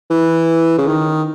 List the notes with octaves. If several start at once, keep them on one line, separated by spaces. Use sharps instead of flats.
E3
C#3
D#3